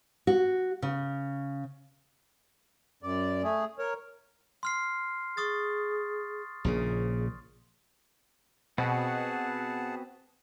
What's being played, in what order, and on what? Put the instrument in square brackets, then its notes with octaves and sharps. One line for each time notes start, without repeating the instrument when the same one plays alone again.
[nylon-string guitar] F#4
C#3
[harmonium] F#2 D5
A3 G#4
A#4 C#5
[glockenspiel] C6 F6 C7
[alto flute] G#4 [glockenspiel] C#6 D#6 A6
[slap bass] A#1 A#2 C#3 [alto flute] G#4
[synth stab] B2 [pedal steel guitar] B3 C4 F#4 [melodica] G#4 F#5 A5